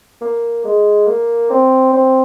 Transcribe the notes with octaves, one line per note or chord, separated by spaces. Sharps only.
A#3
G#3
A#3
C4
C4